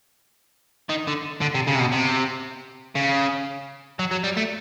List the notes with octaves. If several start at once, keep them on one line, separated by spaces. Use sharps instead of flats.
D#3
D3
D3
C3
C#3
C3
B2
C3
C#3
F#3
F#3
G3
A3